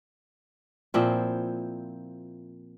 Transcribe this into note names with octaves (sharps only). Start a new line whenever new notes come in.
A#2 F3 C4 E4